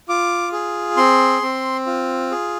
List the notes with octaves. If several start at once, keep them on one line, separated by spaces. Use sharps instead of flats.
F4 D6
G#4
C4 C6
C4
F4
G#4